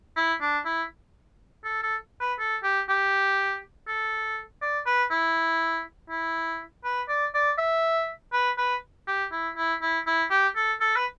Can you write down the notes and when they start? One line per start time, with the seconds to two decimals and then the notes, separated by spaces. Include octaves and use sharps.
0.16 E4
0.41 D4
0.65 E4
1.65 A4
1.83 A4
2.20 B4
2.40 A4
2.64 G4
2.89 G4
3.88 A4
4.62 D5
4.86 B4
5.11 E4
6.10 E4
6.84 B4
7.09 D5
7.34 D5
7.58 E5
8.33 B4
8.58 B4
9.08 G4
9.32 E4
9.57 E4
9.82 E4
10.07 E4
10.31 G4
10.56 A4
10.81 A4
10.96 B4